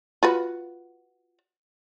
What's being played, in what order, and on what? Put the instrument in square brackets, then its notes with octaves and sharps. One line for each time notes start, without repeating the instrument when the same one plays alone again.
[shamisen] F4 F#4 B4